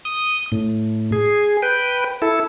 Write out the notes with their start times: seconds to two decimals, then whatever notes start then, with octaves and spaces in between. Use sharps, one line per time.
0.05 D#6
0.52 A2
1.12 G#4
1.62 B4 G5
2.22 E4 A4